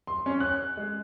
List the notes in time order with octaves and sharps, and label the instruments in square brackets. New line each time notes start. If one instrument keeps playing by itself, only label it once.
[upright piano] C6
C#4
F#6
G#3